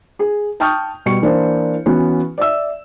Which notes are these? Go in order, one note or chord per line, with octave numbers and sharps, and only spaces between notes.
G#4
G5 A5 C#6 D#6 F6 G6
B2 G3 C#6 C#7
E3 A#3 D4 E4 C5
E3 B3 C#4 F#4
D5 E5 E6